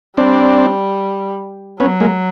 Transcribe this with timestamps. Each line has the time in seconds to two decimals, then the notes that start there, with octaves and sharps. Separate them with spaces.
0.17 G3 C4 D4
1.80 F#3 B3 C#4
2.00 G#3 A#3